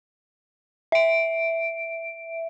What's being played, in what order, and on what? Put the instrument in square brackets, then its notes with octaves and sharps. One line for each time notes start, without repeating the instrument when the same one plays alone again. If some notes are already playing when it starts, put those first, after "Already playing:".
[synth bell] E5 D7